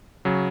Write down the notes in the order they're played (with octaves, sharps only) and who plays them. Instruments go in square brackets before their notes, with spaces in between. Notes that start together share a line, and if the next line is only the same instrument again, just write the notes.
[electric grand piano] C#3 F#3